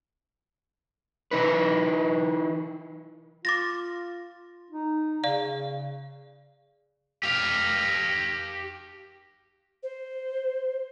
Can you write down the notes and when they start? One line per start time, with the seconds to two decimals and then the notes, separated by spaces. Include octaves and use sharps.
1.31 E3 D#4 B4
3.45 F4 D6 A6 A#6
4.71 D#4
5.24 C#3 D5 F5
7.23 G4 F5
9.83 C5